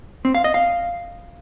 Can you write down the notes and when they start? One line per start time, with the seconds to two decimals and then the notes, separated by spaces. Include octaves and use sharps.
0.25 C4
0.35 F5
0.44 D#5
0.54 F5